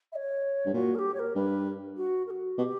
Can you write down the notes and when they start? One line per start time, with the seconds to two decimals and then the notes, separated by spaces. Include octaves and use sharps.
0.12 E5
0.16 C#5
0.66 G2
0.74 A#2 F#4
0.95 A#4
0.99 G4
1.14 C#5
1.19 A#4
1.35 G2 B4
1.97 F#4
2.27 A#4
2.30 F#4
2.58 B2 G4